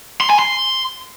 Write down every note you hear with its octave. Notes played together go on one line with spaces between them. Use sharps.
C6
G#5
C6